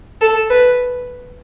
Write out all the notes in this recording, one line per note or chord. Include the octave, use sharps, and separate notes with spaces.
A4
B4